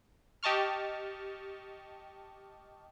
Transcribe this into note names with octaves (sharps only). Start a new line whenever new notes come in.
G4 D#5 A5 C#6 F6